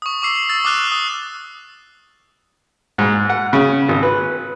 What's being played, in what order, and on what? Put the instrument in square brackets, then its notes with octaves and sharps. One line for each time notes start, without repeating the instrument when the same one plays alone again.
[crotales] C#6 D#6
C#6 D6 E6 C7
E6 A6
D6 D#6 F6 F#6 F7
D#6
[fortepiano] G#2
F#5
C#3
G#1
B4